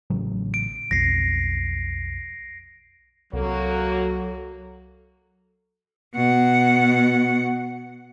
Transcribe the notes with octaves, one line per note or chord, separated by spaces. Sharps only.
A1 C#3 F#3
D7
B1 F2 A#6 C7
C2 F#3 A#3 F#4 A4 C#5
B2 F#5